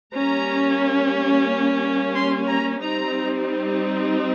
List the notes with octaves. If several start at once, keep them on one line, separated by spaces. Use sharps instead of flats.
G3 A#3 C#4 A#5
C6
A#5
G3 C4 D#4 A#5